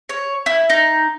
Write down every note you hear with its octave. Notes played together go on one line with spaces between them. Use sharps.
C#5
E4
D#4